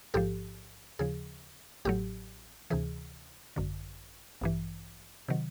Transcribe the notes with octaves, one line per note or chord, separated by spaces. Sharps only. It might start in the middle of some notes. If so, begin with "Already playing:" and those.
A1 G#2 F3 G4 A4
D#2 C#3 F3 G#4
A1 A2 F#3 G4
D2 C3 E3 G#4
G#1 F#2 D3
A1 G2 E3
C3 D#3 F#3